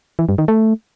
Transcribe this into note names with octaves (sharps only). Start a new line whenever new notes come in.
E3
G2
D#3
A3